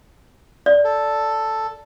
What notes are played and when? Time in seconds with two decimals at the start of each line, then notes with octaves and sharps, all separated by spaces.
0.66 D5
0.85 A4